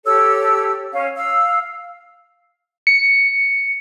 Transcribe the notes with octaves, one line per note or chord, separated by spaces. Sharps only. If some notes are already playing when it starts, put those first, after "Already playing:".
G4 A4 C#5 E6
C#4 F5
F5 E6
C#7